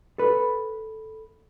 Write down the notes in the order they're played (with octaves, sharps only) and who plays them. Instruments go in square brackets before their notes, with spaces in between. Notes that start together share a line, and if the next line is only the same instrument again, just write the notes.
[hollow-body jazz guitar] A4 B4